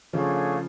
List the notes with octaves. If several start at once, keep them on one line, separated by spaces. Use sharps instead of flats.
C#3 F3 A3 D4 G#4 C#5 F5